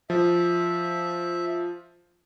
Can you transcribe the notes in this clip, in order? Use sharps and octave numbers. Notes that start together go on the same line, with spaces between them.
F3 E5